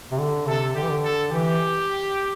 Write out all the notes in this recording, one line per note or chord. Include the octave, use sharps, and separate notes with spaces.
C3
D3
C3 A4
D3 G4
E3
D3
A4
E3 G4